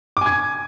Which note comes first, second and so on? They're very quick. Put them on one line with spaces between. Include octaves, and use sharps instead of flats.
D6 G#5 G#6